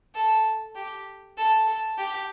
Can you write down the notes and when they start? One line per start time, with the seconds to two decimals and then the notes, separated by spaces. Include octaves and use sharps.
0.15 A4
0.76 G4
1.37 A4
1.67 A4
1.98 G4